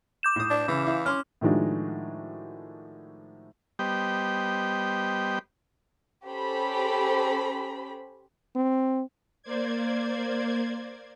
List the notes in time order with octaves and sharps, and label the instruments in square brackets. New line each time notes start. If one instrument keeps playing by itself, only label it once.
[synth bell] D6 G6 E7
[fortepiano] A2 D#6
[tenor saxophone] D4
[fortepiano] C#3 [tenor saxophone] E3
[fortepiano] E4 F5
[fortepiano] C#4 C6 D6 [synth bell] F6
[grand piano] A2 D#3 F3 G#3 D4 F#4
[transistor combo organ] G3 B3 G4 C5 D#5 G5
[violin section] C#4 G4 A4 C5 B5
[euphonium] C4
[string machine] A#3 C5 D5 G#6